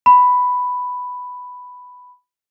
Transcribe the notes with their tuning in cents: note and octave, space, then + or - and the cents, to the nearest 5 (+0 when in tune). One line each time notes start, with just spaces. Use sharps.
B5 +5